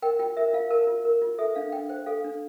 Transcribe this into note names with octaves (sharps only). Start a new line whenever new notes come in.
A#4 G5
F4 G5
A#4 E5
F4 F5
A#4 A5
F4
A#4
F4
A4 E5
D4 F5
D4 G5
C5 G5
A4 F5
D4